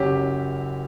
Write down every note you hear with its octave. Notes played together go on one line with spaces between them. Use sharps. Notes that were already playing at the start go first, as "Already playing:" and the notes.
Already playing: F#1 F#2 F#3 G4